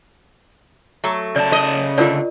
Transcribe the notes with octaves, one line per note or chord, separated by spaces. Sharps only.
F#3 A3
C#3 D5 A5
D#5
D3 A3 F4 A#4 D5